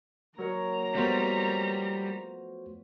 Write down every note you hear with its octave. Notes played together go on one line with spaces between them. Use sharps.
F#3 A#3 A#4 C#5 A#5
F3 G3 A3 B3 F#4 C5